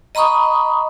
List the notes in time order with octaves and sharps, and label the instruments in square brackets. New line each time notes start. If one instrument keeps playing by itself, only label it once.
[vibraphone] D#5 A#5 B5 C#6 D#6